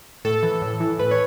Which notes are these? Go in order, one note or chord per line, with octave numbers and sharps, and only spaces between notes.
A2 A4
E3
A2
E3
A2 B4
C#5